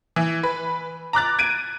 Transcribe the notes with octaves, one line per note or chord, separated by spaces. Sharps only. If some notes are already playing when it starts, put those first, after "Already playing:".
E3
B4
A#5 D6 F#6 A6
G#6 D7 D#7